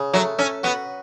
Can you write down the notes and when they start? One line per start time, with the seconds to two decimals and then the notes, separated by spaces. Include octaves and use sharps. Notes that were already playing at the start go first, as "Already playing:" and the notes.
Already playing: C#3
0.14 F#3 A3
0.39 C#4 A4
0.63 B3 F#4